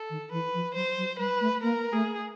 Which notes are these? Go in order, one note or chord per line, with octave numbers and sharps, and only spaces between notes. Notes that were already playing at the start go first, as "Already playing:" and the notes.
Already playing: A4
D#3
E3 B4
F3
F#3 C5
F#3
G3 B4
A3
A#3 A#4
A3 G#4